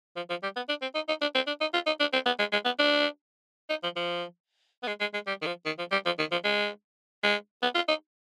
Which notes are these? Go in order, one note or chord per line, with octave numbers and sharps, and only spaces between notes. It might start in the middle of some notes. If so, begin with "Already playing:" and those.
F3
F3
G3
B3
D4
C4
D#4
D#4
D4
C4
D4
D#4
F4
D#4
D4
C4
B3
G#3
G#3
B3
D4
D#4
F3
F3
B3
G#3
G#3
G#3
G3
D#3
F3
D#3
F3
G3
F3
D#3
F3
G#3
G#3
B3
F4
D#4